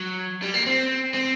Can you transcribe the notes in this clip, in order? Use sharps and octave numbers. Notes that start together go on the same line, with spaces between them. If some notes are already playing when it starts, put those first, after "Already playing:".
Already playing: F#3
G3
A#3
C4
C4